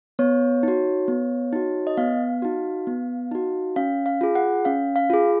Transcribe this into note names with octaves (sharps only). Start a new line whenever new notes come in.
B3 C#5
D#4 F#4
B3
D#4 F#4
D#5
B3 F5
D#4 F#4
B3
D#4 F#4
C#4 F5
F5
F4 G#4
F#5
C#4 F5
F5
F4 G#4